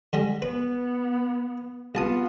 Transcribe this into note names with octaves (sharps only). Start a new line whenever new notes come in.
D3 G3 G#3
B3 B4
C2 B3 F4 A5 D#6